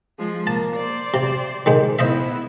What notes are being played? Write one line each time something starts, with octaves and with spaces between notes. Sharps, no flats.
F3 G#3
A#3 A5
C5 D5
C3
D#3 G#3 C5
B3 E4 C5 D#5 E5